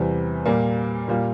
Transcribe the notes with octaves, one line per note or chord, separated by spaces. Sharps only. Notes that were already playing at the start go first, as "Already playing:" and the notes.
Already playing: E2 C3 E3 G3 C4
A#2 G3 A#3
A#2 G3 A#3 F4